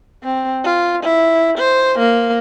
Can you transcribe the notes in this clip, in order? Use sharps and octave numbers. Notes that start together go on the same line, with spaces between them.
C4
F4
E4
C5
A#3